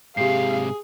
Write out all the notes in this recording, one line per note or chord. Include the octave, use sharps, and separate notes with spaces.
G#2 C3 G4 G#4 F5 C7